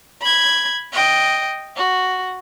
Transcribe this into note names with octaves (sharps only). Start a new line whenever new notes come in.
B5 G#6
D#5 G5
F#4